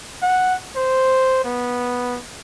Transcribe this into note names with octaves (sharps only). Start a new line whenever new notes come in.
F#5
C5
B3